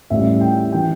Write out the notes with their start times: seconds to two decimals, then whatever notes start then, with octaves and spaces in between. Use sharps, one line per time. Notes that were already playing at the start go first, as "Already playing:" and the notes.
0.10 A1 A2 G3 E5
0.41 G5
0.72 E3 G5